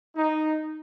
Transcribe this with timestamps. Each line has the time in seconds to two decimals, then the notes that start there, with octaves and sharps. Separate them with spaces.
0.16 D#4